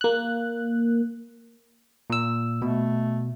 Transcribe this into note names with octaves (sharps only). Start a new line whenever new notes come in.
A#3 F#6
A#2 E6
B2 A3